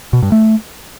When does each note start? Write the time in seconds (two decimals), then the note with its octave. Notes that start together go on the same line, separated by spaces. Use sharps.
0.13 B2
0.22 G2
0.32 A3